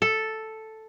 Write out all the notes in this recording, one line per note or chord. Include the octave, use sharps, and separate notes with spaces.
A4